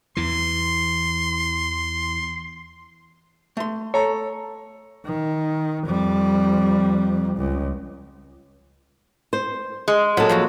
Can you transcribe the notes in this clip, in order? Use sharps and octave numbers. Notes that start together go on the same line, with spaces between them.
E2 E3 C6
A3 C6
A4 C#5 A#5
D#3
F2 G3
C#2
C5
G#3
A#2 F#3 A4
F3 A#3 F#4